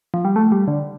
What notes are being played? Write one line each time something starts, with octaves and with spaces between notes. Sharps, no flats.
F3
G3
A3
G3
D3